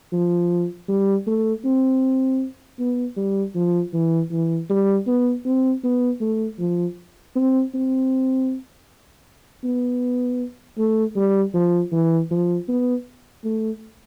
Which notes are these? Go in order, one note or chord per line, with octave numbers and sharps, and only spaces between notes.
F3
G3
A3
C4
B3
G3
F3
E3
E3
G3
B3
C4
B3
A3
F3
C4
C4
B3
A3
G3
F3
E3
F3
B3
A3